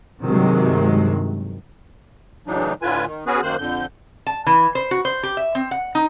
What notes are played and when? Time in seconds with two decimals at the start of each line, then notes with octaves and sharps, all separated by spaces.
0.23 G2 C3 D#3 F#3 G#3
2.47 A2 C#3 E3 F#3 D4 D#4
2.82 A2 D3 F4 B4 G#5
3.06 D#3
3.26 B3 C#4 F#4 G#4 B4
3.42 F#2 D#3 A#3 C5 F#6
3.58 F2 D3 G6
4.27 A5
4.47 E3
4.75 C5
4.91 F#4
5.05 C5
5.23 G4
5.37 E5
5.55 C4
5.71 F#5
5.95 D#4